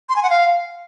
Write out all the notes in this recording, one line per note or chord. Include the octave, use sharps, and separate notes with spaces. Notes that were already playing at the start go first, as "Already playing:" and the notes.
C6
G#5
F#5
F5